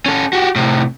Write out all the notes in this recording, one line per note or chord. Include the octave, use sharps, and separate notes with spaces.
C#4 A4
F#4 G4
A2 C3